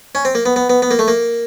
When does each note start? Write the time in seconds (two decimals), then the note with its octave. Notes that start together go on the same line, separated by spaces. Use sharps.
0.15 C#4
0.25 C4
0.35 A#3
0.46 B3
0.56 B3
0.70 B3
0.82 B3
0.91 A#3
0.99 A3
1.08 A#3